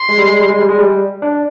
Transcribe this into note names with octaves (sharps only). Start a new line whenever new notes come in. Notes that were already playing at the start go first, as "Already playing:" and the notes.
Already playing: C6
G#3
G3
G#3
G3
G#3
G3
G#3
G3
D4